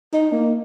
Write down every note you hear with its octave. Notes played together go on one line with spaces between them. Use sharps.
D#4
A#3